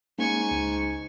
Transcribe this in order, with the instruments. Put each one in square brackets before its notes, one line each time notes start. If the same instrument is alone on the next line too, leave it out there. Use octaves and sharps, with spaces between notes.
[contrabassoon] G#2 [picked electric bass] A#3 C#4 [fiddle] G#5 C#6
[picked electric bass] C#2